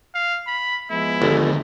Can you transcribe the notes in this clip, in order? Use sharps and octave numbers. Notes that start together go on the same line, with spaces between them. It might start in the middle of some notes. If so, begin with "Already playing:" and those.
F5
B5
F3 G#3 B3 E4
G1 D#2 D3